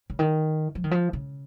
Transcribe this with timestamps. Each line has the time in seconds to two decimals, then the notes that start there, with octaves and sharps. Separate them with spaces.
0.10 C#3
0.19 D#3
0.75 F3
0.84 D#3
0.91 F3
1.13 C#3